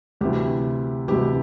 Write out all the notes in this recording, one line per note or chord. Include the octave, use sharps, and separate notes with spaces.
D2 C3 E3 G4
D2 C3 E3 G4